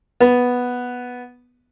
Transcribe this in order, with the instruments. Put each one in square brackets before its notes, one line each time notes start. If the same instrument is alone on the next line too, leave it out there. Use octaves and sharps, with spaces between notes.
[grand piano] B3